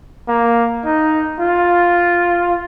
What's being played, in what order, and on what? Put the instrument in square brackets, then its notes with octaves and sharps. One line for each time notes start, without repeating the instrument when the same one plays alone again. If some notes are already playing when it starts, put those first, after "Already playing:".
[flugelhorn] A#3
D#4
F4